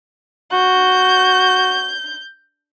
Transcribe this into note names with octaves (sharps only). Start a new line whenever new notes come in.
F#4 G6